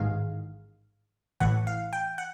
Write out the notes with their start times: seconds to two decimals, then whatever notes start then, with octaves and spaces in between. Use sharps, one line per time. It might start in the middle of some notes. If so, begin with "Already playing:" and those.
Already playing: A1 G#2 D#3 G#3 F5
1.40 A1 A2 E3 F#5
1.67 F5
1.93 G5
2.18 F#5